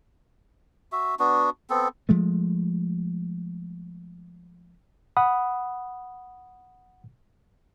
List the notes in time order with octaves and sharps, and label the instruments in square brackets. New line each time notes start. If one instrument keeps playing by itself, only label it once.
[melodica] F#4 E5
B3 D4 F#4
B3 C4 A4
[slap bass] F3 G#3 A3
[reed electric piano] F#5 B5 D#6